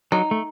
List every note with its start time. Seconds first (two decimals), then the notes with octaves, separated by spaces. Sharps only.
0.12 F#3 D#4
0.31 A3